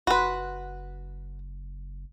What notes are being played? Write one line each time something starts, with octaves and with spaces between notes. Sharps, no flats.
F#1 F#4 B4 B5 C6